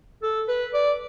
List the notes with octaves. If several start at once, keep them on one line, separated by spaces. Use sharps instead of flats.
A4
B4
D5